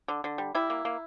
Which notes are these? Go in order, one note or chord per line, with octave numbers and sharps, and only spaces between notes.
D3
D3
G3
G3 E4
A#3
A#3